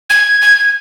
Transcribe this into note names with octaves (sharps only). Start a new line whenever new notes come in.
G#6
G#6